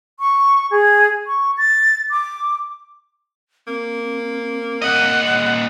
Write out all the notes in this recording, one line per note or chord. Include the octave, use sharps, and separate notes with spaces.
C#6
G#4
C#6
A6
D6
A#3 C4
A#2 D#5 F#5